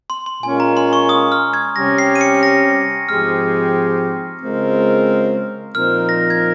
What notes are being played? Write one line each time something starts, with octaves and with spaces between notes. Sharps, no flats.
C6
C6
A#2 G#3 C#4 F4 A#4 G#5
A#5
C6
C#6
D#6
F6
G#6
C3 G3 C#4 G4 A#6
C7
D#7
C#7
A#6
G#2 F3 G#3 C4 G4 F6
C#3 G#3 C4 F4 A#4
A#2 F3 C4 D#4 A#4 F6
A#6
G#6